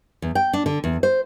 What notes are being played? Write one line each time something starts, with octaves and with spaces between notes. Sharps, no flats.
E2
G5
D4
D3
E2
C5